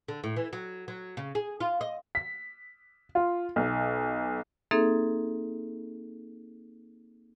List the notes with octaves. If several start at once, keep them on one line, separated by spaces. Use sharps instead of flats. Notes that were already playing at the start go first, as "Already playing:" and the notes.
D3
A2
E3
F#3
F#3
C#3
G#4
F4
D#5
B6
F4
B1
A#3 C4 D#4 G#4 A4 E5